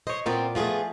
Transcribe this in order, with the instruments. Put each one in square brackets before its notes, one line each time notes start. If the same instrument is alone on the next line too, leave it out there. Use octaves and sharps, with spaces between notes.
[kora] C5 C#5 [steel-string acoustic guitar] D#5
[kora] A#2 B3 D5 [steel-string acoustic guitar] C4 F4 A#4
[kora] F3 A3 [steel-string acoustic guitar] B3 F4 G#4